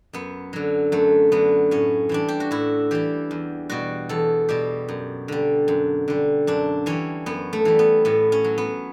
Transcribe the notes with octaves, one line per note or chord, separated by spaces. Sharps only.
F#2 B3
D3 F#3
F#2 A3
D3 F#3 B3
A2 C#4
E3 G3 D4
G4
F#4
A2 E4
E3 G3 G4
E2
B2 G3 F#4
E2 A4
B2 G3 G4
F#2
D3 G3
F#2
D3 G3
F#2 D4
E3 G3 C#4
F#2 B3
A3
E3 G3
B3
A2 B3
C#4
F#3
B3